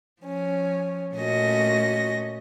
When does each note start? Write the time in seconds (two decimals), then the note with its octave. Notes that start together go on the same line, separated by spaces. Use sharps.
0.22 F3 C#4
1.14 A#2 A3 C#4 F#4 D#5 A#6